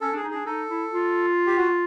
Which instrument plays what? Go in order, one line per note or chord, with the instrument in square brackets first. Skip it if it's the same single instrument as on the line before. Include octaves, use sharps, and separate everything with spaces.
[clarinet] C#4 [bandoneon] A4
[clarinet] D4
[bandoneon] G#4
[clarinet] D#4
[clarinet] D4 [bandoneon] G#4
[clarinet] D#4 [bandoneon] A4
[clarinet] E4
F4
[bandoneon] G4
F#4